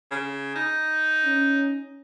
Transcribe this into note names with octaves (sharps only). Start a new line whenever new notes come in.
C#3
D#4
C#4